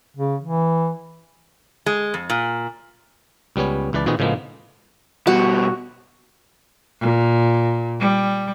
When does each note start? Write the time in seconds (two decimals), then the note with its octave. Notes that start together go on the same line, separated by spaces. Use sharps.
0.17 C#3
0.42 E3
1.86 G#3
2.14 F2
2.30 A#2
3.56 C#2 G3 B3 C#4 C#5
3.93 C#2 E3 B4 D5 A5
4.06 A#2 D#3 B3 C4 F#4 G#4
4.19 A2 C#3 F3 G#3 A#3 B3
5.27 B2 G3 F#4
7.01 A#2
8.00 G3